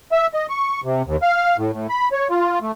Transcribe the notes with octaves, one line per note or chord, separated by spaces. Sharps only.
E5
D#5
C#6
C3
D#2
F5
A2
A2
B5
C#5
F4
A3